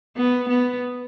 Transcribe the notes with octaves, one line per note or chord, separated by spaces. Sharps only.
B3
B3